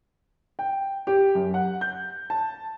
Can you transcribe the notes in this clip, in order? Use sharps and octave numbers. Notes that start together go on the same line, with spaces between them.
G5
G4
F#2
F#5
G6
A5